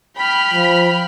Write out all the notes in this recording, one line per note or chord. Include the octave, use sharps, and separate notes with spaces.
G5 B5 F6
F3